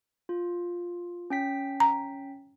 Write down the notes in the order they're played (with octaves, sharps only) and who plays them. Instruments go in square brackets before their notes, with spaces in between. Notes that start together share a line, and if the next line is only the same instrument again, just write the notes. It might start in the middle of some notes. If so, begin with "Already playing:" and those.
[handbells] F4
C#4 G5 B6
[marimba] A#5